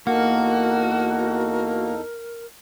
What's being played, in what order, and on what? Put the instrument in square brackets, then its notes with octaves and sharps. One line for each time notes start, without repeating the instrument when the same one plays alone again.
[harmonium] E2 D#4 A4 [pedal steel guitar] A#3 [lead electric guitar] F#4 [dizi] A#4